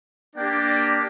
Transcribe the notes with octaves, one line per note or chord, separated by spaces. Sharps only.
A#3 D4 G4 D5 G5